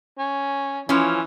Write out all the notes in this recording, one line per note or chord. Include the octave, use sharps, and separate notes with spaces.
C#4
E3 F3 C#4